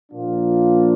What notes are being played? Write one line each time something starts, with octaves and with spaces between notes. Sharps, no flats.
A#2 F3 A#3 D4 F4